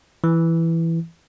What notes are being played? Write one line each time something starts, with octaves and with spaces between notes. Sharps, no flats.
E3